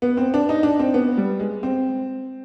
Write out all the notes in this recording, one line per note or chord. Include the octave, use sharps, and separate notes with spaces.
B3
C4
D4
D#4
D4
C4
B3
G3
G#3
C4